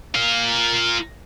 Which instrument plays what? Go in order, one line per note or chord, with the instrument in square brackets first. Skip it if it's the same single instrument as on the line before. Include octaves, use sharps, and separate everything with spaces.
[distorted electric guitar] F4 A#4